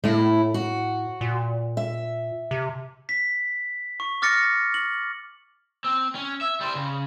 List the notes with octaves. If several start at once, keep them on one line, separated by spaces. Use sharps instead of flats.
A2 A3 E4
F#4
A#2
E5
C3
B6
C#6
D6 F6 A6 A#6 C#7
F#7
C4
C#4
E5
G3 C5
C#3